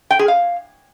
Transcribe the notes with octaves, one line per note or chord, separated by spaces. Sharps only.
G5
G#4
F5